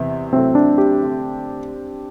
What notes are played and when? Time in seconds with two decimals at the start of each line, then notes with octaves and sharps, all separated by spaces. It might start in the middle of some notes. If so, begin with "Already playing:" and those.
Already playing: E2 C3 E3
0.33 C3 F#3 A3 C4 E4 A4
0.55 D4
0.78 G4
1.01 D3 A3 C4